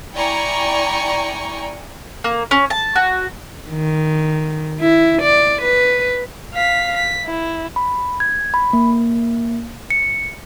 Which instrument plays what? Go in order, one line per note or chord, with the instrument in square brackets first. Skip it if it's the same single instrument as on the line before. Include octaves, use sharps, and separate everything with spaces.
[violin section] E4 D5 G5 G#5 A#5 C#6
[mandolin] A#3
C#4
A5
F#4
[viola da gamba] D#3
E4
D5
B4
[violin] F5 B6
B6
E4
[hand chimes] B5
G#6
B5
A#3
C#7